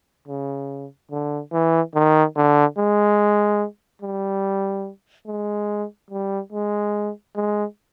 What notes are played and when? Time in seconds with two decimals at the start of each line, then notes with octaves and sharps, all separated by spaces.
0.28 C#3
1.11 D3
1.52 E3
1.95 D#3
2.36 D3
2.78 G#3
4.02 G3
5.27 G#3
6.11 G3
6.52 G#3
7.36 G#3